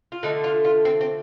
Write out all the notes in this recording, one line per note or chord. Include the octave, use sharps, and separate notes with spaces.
F4
D3 F3 A3 D#4
F4
F4
C4
C4